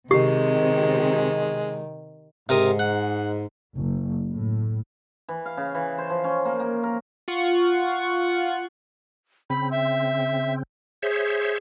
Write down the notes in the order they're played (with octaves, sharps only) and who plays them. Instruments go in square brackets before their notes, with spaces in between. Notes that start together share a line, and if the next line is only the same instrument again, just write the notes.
[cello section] C3 [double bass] D#3 [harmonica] G#3 [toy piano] G4
[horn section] G#2 [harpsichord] C3 A#4 D#6
[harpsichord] F#5
[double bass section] F#1
A2
[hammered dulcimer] E3
F5
C#3
E3
C5
F3
C#4
A#3
A#3
A#4
[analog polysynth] F4 F#5 C#6
[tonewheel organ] C#3 C4 [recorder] B5
[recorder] E5
[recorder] G#4 [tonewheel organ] C5 C#5 E5